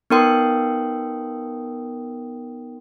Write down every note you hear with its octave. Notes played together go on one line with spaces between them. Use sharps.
B3 D#4 A#4 G5 C6 D#6